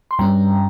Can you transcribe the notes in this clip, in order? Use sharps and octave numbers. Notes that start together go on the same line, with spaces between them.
C6
G2 G3 C#4 G5 A#5